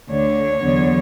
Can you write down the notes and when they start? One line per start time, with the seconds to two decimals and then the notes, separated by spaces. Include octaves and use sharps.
0.10 D2 D3 A3 D4 C#5
0.63 E2 D3 F#3 B3